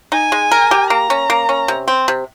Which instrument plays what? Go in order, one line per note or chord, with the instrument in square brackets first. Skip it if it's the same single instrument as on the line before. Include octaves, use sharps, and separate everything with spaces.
[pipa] D#4 [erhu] G#5
[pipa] G#3
A#4
G4
[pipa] A#3 [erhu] A#5
[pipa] C#4
A#3
C#4
C3
C4
C3